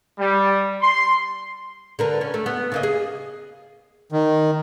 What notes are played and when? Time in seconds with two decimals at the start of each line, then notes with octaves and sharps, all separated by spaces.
0.19 G3
0.82 C6
1.99 D3 A#4 B4
2.21 C#4
2.34 A3
2.46 B3
2.72 C#3 A#3 D#5
2.83 G#4
4.12 D#3